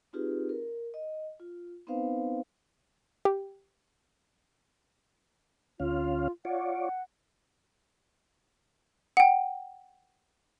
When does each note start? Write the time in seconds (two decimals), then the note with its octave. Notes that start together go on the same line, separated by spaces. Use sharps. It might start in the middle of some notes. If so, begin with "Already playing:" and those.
0.13 C4 D#4 F4 G4 G#4 B4
0.49 A#4
0.94 D#5
1.40 F4
1.87 B3 C4 D#4 B4 C5 F5
3.25 G4
5.80 D2 C#4 F4 F5
6.45 F4 C#5 D5 F#5
9.17 F#5 G5